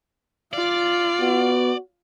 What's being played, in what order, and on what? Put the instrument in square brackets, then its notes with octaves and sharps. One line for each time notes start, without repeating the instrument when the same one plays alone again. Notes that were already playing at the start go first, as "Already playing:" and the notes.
[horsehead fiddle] F4 [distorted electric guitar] D5
[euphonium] B3 [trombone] F#4